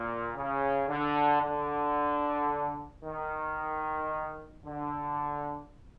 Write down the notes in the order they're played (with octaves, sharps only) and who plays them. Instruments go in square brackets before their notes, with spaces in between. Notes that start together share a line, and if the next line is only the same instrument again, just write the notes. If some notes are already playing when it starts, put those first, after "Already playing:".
Already playing: [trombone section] A#2
C#3
D3
D3
D#3
D3